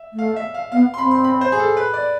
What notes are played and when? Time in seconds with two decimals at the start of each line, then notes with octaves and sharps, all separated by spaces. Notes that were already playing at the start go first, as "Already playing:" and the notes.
Already playing: E5
0.13 A3
0.19 F5
0.36 E5
0.54 F5
0.72 B3 F5
0.94 C6
0.98 C4 B5
1.11 C6
1.24 B5
1.41 C5
1.52 G#4
1.60 A4
1.77 B4
1.93 D5